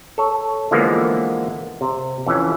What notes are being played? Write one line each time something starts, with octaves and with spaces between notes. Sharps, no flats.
A4 C#5
D3 E3 F3 G#3 A#3 B3
C3
F2 E3 C#4